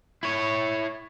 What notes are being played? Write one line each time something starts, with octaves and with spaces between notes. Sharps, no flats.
E4 C#5